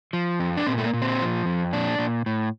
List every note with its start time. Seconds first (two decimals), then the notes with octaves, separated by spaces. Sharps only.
0.13 F3
0.40 F2
0.57 D4
0.67 A#2 C4
0.78 A3
0.84 A#3
0.93 A#2
1.02 C4
1.20 F3
1.46 F2
1.73 A#2 D4
1.99 A#2
2.26 A2